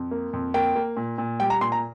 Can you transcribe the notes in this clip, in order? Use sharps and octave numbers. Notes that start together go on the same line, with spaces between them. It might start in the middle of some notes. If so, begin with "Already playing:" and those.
Already playing: F2
A#3
F2
A#3 G5
A#3
A#2
A#2
G3 G5
A#5
A#2 C6
A#5